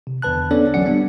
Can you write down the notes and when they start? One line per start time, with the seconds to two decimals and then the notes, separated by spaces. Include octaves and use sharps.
0.07 C3
0.22 E2 D3 B4 A5 F#6
0.51 B3 C#4 D4 A4 C#5 D5
0.74 A1 F#3 C#4 D5 F#5 C#7
0.86 G3 B3 D4